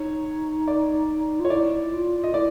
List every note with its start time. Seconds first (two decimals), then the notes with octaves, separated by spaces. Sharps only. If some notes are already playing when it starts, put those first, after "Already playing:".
Already playing: D#4 C#5
0.68 D5
1.40 F4 C#5
1.50 E4 D5
1.93 F4
2.24 D#5
2.34 E4 D5